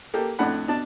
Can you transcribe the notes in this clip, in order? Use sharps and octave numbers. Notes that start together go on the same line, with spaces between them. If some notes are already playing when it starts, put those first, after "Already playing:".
A#3 G4 A4
F2 A2 D4 F#5 B5
B2 D4 D5 A5